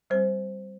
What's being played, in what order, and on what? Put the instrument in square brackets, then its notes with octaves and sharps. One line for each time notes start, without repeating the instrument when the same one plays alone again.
[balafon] G3 C4 C5